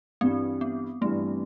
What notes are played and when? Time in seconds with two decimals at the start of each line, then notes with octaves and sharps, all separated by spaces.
0.21 G2 E3 G3 C4
0.61 B3
1.01 G2 E3 G3 A3